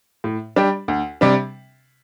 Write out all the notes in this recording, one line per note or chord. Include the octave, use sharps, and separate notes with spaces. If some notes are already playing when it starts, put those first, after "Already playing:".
A2
G3 D4 G4
D2
C3 G3 D4